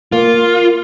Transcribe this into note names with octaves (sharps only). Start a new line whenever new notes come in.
A#3 F4